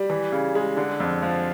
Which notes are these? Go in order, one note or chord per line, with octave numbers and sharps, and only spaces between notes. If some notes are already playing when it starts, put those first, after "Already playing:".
Already playing: G3
E3
C#3
G#3
D3
F2
F3